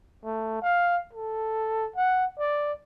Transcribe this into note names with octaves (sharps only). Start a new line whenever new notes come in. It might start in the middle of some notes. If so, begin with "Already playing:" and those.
A3
F5
A4
F#5
D5